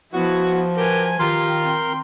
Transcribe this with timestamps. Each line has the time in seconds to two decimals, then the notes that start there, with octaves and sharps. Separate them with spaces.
0.13 F3 B3 E4 F#4
0.76 F#4 G4 A#4 B4 G#5
1.19 D#3 F4 G4 A#4 C6
1.61 C4 G5